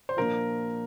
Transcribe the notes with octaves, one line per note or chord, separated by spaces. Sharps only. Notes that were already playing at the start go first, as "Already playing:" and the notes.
C5
A#2 F3 D4 F4 A#4